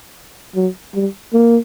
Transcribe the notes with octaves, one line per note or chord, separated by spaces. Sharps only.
F#3
G3
A#3